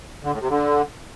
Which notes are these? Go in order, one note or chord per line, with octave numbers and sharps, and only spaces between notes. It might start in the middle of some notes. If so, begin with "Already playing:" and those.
D3
A2
C3
D3